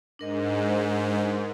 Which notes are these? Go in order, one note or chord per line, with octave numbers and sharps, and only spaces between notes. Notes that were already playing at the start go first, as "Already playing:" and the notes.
G#2 D4 A#4 D#5